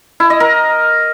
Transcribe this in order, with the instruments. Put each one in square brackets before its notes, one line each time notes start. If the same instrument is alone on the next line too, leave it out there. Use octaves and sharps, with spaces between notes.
[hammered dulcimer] E4
D#5
A#4